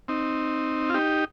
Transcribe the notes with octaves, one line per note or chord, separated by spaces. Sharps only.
C4 D#4
F4
D#4 G4